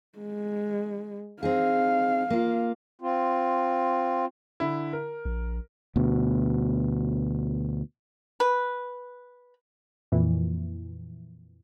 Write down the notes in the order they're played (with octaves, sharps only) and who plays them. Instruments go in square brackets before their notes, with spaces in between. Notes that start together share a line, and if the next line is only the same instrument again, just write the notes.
[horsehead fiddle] G#3
[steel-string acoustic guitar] C4 D#4 G#4 [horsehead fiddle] F5
[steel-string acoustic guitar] A#3 F4
[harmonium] C4 F4
[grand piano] D3 E4
A#4
[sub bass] A#1
[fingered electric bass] D2 B2
[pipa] B4
[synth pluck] F2 A#2 E3